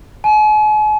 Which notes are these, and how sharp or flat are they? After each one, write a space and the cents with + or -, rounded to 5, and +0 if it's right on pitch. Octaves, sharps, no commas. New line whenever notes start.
G#5 +45